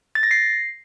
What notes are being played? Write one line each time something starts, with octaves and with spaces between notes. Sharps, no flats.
A6
A#6
C7